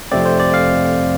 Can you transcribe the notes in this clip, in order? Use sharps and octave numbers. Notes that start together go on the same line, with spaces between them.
F2 C3 A3 C4 D5
C5
D5
F5